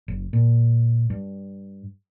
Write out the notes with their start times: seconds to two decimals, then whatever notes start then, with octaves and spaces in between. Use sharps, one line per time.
0.08 F#1
0.33 A#2
1.10 G2